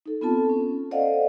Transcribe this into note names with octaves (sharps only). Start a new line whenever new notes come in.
D#4 A4
B3 C4 F4 A4 A5
C#4
A4 C5 D5 D#5 F5 F#5